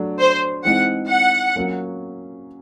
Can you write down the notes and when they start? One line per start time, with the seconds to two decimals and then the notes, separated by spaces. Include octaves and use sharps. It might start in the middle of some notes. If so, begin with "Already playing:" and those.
Already playing: F#3 A3 D4
0.20 C5
0.64 E3 G#3 C4 D#4 F#5
1.11 F#5
1.56 F#3 A#3 C#4